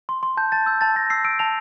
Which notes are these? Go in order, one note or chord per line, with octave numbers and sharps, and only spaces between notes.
C6
C6
A5 G6
A5 A6
E6 G6
A5 A6
A5 A#6
E6 C7
E6 D7
A5 F7